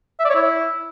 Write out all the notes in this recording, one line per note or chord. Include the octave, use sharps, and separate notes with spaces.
E5
D5
C#5
E4